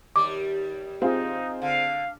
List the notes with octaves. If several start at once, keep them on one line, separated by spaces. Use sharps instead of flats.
D#2 G3 D6
C4 D#4 F4 G#4
D3 F5